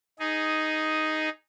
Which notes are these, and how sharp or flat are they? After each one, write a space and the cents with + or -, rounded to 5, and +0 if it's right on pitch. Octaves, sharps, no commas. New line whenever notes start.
D#4 +0 G#4 +0